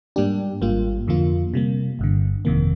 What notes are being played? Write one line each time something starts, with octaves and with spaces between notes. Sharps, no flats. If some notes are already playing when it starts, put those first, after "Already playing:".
G#2 G3 A#3 D4 G4
G#1 G#2 G3 A#3 F4
F2 D3 F3 A#3 F4
C3 G3 A#3
G1 G2 D3
G1 F2 C3 D#3 A#3